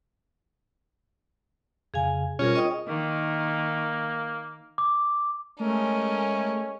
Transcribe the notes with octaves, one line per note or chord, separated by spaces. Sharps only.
F2 C#3 G#4 F5 G#5
B2 G3 C#4 F4 G#4 A#4 C5
F4 D#5 G5 C#6 D#6
D#3 A#3
D6
G#3 A3 C#4 A#4 D#5